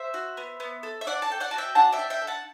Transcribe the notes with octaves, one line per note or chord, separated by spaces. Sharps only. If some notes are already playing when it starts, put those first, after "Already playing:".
Already playing: C5 E5
F#4
B3
B3
A4
E5
D4 D5 F#5
A5
A4 G5
D5 F#5
F#4 A5
E5 G5
D4 F#5 A5
E5 G5
D4
E5 G5
A4
F#5 A5